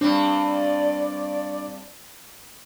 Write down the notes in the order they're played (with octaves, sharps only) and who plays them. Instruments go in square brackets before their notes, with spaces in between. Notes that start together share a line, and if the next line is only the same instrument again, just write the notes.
[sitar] G2 C4 [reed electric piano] D4 [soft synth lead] D5